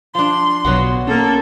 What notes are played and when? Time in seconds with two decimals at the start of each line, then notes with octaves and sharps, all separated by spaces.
0.15 F3 D4 C6
0.65 B1 B2 F#3 B3 F#4
1.07 A#3 C#4 A4